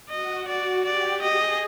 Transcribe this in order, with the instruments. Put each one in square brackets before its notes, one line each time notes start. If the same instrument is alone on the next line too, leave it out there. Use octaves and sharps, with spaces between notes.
[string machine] F#4 [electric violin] D#5
[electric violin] D5
[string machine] G4 [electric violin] D5
[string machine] G#4 [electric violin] D#5